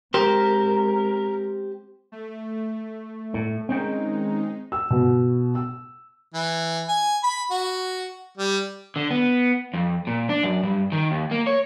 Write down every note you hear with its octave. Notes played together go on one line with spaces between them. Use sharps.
G#3 C4 G4 A#4 C5
A3
A2
D#3 G#3 C4 C#4 D#4 G5
E6
B2
E6
E3
G#5
B5
F#4
G3
D3
B3
F2
A#2
D4
F#2
G2
D#3
D#2
A#3
C#5